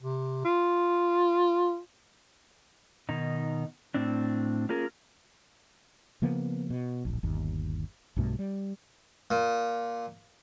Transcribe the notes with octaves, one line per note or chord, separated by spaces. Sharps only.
C3
F4
B2 D#3 D#4
A2 C4 D4
A#3 C#4 F4 G#4 A#4
C#3 F3 A#3 B3
B2
D1 A#1
G1 D#2
B1 G2 B2 A3
G3
A#2